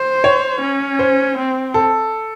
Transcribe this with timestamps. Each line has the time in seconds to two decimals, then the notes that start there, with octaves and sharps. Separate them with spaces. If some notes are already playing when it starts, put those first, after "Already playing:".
Already playing: C5
0.24 C#5
0.62 C#4
0.99 C5
1.38 C4
1.74 A4